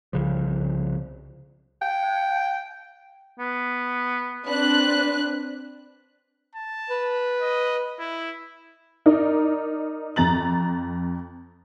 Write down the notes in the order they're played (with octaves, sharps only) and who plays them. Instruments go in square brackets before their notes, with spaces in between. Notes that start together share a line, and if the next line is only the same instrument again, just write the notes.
[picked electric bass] C2 C#3 F3
[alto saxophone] G5
[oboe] B3
[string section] C4 D4 F#6 [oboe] B4
[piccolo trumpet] A5
[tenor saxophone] B4
[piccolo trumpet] D#5
E4
[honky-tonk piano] D#4 A#4 D5
F2 A#5 A6 F#7